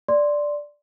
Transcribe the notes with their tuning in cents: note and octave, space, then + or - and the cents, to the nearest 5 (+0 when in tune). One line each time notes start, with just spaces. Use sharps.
D5 +0 C6 +0